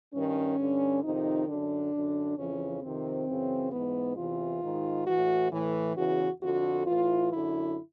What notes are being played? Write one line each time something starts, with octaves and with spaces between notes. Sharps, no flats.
G2 D#3 C#4
G2 D3
F2 C3 D#3 D#4
F#2 D3 D4
F#2 D3
F2 C#3 E3 C#4
F2 C3 D#3 C4
F#2 C#3 E3
G#2 E3 B3
E2 C3 E3 F4
G#2 D#3
A2 E3 F#4
A2 E3
E2 C#3 E3 F#4
F2 D3 F#4
A2 E3 F4
F#2 D3 E4